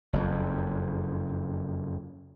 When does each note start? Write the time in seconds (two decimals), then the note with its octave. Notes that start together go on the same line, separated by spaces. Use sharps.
0.13 F#1 F2